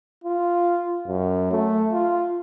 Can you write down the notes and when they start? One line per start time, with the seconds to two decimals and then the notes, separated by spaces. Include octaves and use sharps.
0.24 F4
1.07 F#2
1.52 A3
1.93 F4